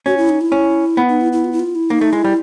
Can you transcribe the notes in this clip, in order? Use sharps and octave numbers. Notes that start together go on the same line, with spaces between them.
C#4 F#4
E4
D#4
E4
C#4
B3
D#4
E4
E4
F4
E4
F4
E4
A#3 D#4
A3
G#3 E4
G3